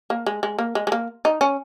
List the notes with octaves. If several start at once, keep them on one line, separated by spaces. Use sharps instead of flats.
A#3
G#3
G#3
A#3
G#3
G#3
A#3
D#4
C#4